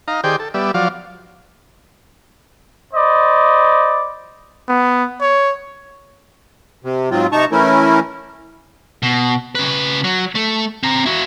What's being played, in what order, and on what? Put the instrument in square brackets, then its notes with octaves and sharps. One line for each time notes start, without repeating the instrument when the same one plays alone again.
[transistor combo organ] D#4 F5 A#5
D#3 G4 G#4 C5 D5 G5
A4
G3 B3 D5 E5
F3 F#3 D5 F5
[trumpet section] C5 D5 D#5 B5
[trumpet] B3
C#5
[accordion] C3
G#2 F#3 C4 F4
C3 D#4 A5 A#5 C#6
E3 A3 C#4 E4 A#4
[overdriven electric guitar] B2
C#3 B4
F#3
A3
C4 A#5
E4 F#4